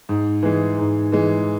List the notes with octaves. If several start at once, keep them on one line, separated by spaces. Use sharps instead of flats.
G#2
E3 G#3
G#2
E3 G#3